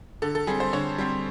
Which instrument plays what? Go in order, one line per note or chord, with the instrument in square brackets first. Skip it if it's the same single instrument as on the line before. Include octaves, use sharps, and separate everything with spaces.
[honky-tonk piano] D3 A4
A4
G3 C4 G#4
C5
D3 C#5
G3 C4